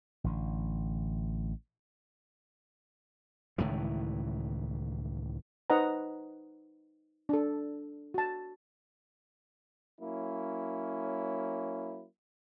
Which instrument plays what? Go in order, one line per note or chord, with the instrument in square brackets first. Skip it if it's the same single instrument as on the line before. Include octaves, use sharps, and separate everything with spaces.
[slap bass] A1 D3
C#2 A2 D#3 E3
[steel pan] D#4 B4 C5 D#5 F#5 A#5
D4 A4
F#4 A5
[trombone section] F#3 A#3 C#4 E4